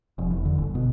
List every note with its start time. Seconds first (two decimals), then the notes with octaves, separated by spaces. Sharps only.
0.18 F1
0.31 E2
0.45 D3
0.58 G1
0.75 B2